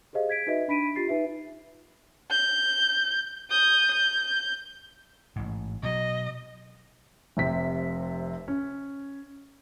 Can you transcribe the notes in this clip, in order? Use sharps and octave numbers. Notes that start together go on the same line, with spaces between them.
G4 G#4 C5 D#5 F5
G#6 B6 D7
D#4 F#4 B4 D#5 E5
D4 B5 B6 D7 D#7
F4 G4 A6 C7
D#4 B4 E5
G6
D#6 G6
G6
A1 G#2
B2 F#3 D#5
F1 C3 B6
C#4